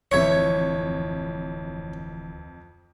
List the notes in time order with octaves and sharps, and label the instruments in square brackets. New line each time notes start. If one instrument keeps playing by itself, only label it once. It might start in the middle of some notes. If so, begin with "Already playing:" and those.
[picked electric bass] D1 D3 E3 [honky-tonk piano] F2 G#6 C#7 [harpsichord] C#5 E5